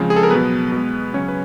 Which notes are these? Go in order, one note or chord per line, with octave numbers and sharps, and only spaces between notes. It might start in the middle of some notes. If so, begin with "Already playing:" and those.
Already playing: C#3 F3 G#3 C4
G#4
A4
A#4
B2 F#3 B3 B4
B2 G#3
C#3 F#3 C#4 C#5
B4